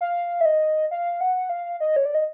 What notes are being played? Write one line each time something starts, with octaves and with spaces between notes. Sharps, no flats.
F5
E5
D#5
F5
F#5
F5
D#5
C#5
D5
D#5